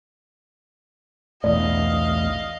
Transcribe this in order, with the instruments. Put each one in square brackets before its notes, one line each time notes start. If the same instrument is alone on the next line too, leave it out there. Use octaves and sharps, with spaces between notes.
[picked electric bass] B1 E2 A2 [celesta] D5 [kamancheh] D#5 F5